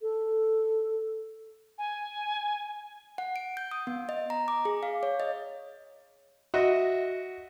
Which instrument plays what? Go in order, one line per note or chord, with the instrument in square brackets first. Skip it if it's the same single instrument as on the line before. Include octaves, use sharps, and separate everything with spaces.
[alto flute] A4
[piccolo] G#5
[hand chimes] F#5
D7
G6
D#6
B3
D#5
A#5
D6
G#4
F5
C#5
D#5
[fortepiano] F#4 D#5 E5